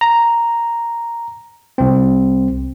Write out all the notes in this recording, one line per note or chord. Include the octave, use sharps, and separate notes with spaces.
A#5
C2 C4